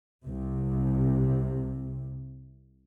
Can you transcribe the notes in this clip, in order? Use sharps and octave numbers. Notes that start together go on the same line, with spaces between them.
C2 C3